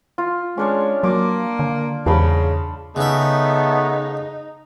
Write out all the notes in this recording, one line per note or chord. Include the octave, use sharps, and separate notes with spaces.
F4
G#3 C#4 D4 C#5
F#3 A#3 D6
D3
E2 G#2 C#3 A5 B5
C#3 A3 B3 D#4 E5